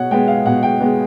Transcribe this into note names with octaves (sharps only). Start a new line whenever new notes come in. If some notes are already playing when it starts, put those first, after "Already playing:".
Already playing: B2 C#5 F#5
G#3 B3 G5
F5
B2 F#5
G5
G#3 B3